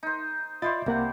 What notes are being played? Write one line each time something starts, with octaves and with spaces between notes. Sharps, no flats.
D#4 C5
E4 F4 C5 D5 D#5 A6
C2 C3 A#3 F#5